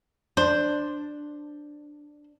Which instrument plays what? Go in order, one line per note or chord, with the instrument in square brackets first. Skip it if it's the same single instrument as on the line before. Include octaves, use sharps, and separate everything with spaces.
[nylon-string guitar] D4 [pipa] C5